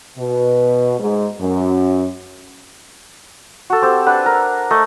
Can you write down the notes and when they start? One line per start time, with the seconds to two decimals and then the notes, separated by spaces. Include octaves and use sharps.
0.17 B2
0.99 G#2
1.39 F#2
3.70 F#4 A4
3.82 C4 G4 A4
4.06 D4 B4 F#5
4.26 A#4
4.71 A3 D#5